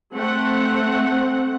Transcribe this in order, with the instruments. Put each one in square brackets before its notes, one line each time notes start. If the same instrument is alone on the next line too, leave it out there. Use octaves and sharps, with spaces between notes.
[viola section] A3 C4 F#5